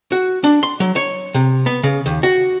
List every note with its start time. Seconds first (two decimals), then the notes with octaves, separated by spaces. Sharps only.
0.12 F#4
0.44 D4
0.63 C6
0.80 F#3
0.96 C#5
1.34 C3
1.66 B3
1.83 C#3
2.06 D#2
2.23 F#4